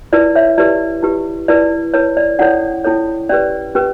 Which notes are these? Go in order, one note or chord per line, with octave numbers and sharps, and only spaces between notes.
E4 B4 D5
C#5 E5
E4 G4 B4 D5
E4 G4 B4
E4 B4 D5
E4 B4 C#5
D5
C#4 E4 A4 C#5 D5 F#5
C#4 E4 A4 C#5
C#4 G4 B4 D5
C#4 G4 B4